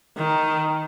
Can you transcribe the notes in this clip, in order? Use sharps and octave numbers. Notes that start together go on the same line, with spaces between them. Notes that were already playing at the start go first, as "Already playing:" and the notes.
D#3